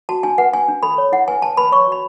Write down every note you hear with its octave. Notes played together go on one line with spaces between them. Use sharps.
F#4 A5
D4 G#5
B4 F#5
D4 G#5
D4
A4 B5
C#5
E4 F#5
B4 G#5
B4 A5
B4 B5
C#5 C#6
F#4 B5